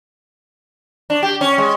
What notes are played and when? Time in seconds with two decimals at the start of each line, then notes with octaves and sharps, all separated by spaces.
1.10 D4
1.23 G4
1.41 C#4
1.58 G#3